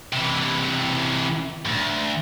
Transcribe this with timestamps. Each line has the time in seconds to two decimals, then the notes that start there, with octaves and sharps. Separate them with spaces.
0.13 C3 E3
1.65 D2 G#2